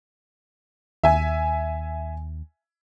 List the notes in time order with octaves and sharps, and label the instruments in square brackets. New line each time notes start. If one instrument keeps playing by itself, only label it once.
[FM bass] D#2 [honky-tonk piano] E5 G#5